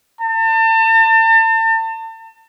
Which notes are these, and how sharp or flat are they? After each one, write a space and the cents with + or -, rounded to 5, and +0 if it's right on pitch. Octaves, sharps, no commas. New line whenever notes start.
A5 +35